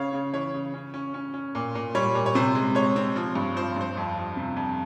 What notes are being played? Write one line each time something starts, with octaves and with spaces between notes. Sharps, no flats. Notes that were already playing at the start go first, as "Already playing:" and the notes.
Already playing: C#3 C#5 F5
C#3
E3 C#5
C#3
C#4
C#4
C#4
C#4
A#2
A#2
G3 C#5
A#2
C#5
C3 C5
G#3
G#3 C#5
C4
F3
G2
F3 C5
G2 C5
F2
F3
C3
F2